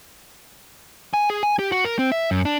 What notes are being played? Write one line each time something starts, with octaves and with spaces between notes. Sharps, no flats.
G#5
G#4
G#5
G4
F#4
A#4
C4
E5
F#2
D4